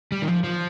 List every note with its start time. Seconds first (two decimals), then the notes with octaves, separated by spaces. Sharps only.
0.12 G3
0.22 D#3
0.28 F3
0.44 F3